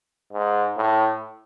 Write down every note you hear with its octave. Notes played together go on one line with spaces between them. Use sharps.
G#2
A2